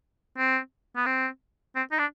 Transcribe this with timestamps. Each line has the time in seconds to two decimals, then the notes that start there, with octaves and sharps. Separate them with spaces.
0.38 C4
0.96 B3
1.06 C4
1.76 C4
1.92 D#4
1.99 D4